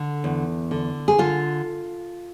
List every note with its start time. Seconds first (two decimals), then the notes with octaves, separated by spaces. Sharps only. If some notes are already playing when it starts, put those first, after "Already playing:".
Already playing: D3
0.24 E2
0.71 D3
1.08 G#4
1.18 D3 F4